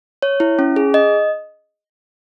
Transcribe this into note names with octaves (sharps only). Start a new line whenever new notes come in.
C#5
E4
C#4
G#4
D#5